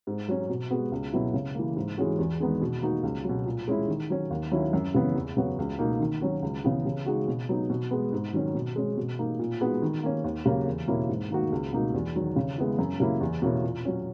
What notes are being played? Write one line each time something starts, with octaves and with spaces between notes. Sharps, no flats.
G#2
F#3 C#4
B2
G#3 B3 F#4
C#2
B2 F#3 B3 E4
C#3
E3 A#3
G#2
E3 G#3 C#4 F#4
E2
D#3 G#3 B3 D#4
B2
A#3 D#4 F#4
C#2
F#3
B2
A#2
G#3 C#4 E4
D#3
F#3 C#4
D#2
D#3 F#3 C#4 E4
F#2
C#3 E3 B3
E2
C#3 F#3 B3 F#4
C#2
B2 A#3 D#4
D#3
F#3 C#4 F#4
C#2
C#3 E3 B3
C#3
G#3 D#4 F#4
B2
F#3 B3 D#4
B2
G#3 B3
G#2
D#3 F#3 C#4
B2
G#3 C#4
B2
A#3 D#4
A#2
G#3 B3 D#4 F#4
D#3
A#3 C#4
D#2
C#3 F#3 A#3 C#4
E2
B2 A#3 C#4 E4
G#2
D#3 A#3 D#4 F#4
C#2
B2 A#3 D#4 F#4
E2
D#3 F#3
C#3
G#3 B3 E4
F#2
C#3 F#3 A#3 E4
E2
B2 A#3 C#4 E4
A#2
F#3 C#4